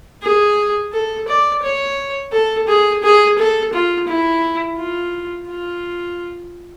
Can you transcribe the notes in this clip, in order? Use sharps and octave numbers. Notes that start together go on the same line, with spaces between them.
G#4
A4
D5
C#5
A4
G#4
G#4
A4
F4
E4
F4
F4